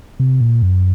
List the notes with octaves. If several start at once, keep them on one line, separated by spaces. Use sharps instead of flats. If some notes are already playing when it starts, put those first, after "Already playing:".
C3
A#2
F#2